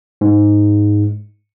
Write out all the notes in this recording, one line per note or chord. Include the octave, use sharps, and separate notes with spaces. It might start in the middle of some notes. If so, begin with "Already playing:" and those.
G#2